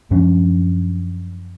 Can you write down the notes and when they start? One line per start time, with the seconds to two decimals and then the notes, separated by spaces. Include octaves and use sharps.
0.11 F#2 F3 C#4 D4